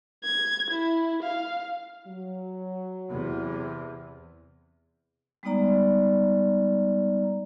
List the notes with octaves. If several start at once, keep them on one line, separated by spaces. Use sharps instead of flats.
G#6
E4
F5
F#3
E2 C3
G3 G#3 B3 D#4 D5 A#5